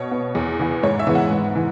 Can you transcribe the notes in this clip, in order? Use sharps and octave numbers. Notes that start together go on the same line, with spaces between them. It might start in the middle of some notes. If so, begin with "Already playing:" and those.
Already playing: B2 C#5
B3
E2
E3 B3
G#2 C#5
E5
E3 G#3 B3
F#5
G#2
E3